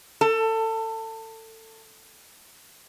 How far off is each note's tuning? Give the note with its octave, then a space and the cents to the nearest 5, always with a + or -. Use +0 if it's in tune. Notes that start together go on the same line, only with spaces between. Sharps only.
A4 +25